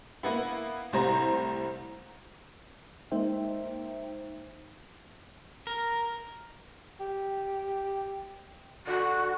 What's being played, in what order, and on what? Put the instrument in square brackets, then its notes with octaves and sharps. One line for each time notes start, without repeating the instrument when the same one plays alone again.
[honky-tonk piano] A#3 B3 E4
C2 A2 G3 C5 A#5
[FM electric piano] G#3 A#3 D#4 C5 E5 G5
[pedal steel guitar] A#4
[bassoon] G4
[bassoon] D3 [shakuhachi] F#4